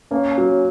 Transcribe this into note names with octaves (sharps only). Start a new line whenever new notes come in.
A#3 C#4
F#3